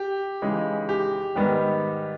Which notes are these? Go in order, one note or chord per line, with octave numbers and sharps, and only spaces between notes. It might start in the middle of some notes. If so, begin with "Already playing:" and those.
Already playing: G4
C#3 E3 G#3 D#4 G#4
G4
G#2 D#3 G3 B3 D#4